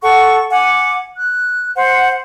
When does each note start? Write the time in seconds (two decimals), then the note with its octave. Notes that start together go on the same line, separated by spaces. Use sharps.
0.01 A4 F#5 C#6
0.51 F#5 G#5 D6
1.16 F#6
1.76 C5 F#5